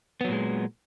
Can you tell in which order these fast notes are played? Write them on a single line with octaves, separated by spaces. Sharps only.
B3 F#3 A#2 G#3